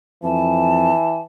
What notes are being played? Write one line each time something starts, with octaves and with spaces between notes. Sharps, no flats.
F2 E3 A5